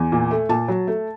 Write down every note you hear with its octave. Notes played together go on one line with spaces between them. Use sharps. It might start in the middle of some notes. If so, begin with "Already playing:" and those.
Already playing: E2 G#5
A#2
A3
A#2 A5
F#3
A3